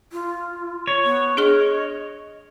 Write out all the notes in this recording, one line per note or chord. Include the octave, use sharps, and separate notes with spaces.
F4
C#5
B3
D4 G#4 D#5 F6